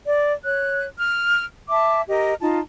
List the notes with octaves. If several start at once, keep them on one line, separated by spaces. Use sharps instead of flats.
D5
C#5 F#6
F6
E5 A5 D6
G4 A#4 D#5
D#4 F4 A5